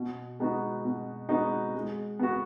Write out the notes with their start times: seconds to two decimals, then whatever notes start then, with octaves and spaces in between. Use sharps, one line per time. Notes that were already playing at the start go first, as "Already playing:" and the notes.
Already playing: B2
0.40 G#3 B3 D#4 F#4
0.85 B2
1.29 G#3 B3 D#4 F#4
1.75 G#3
2.19 B3 F#4